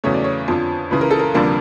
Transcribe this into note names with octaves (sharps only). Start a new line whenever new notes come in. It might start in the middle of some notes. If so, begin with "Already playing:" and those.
E2 C#3 F#3 A3 C#5
D5
C#5
F2 D3 F3
C#2 C#3 E3 B4
A#4
A4
A#4
F1 F2 D3 G3 A#3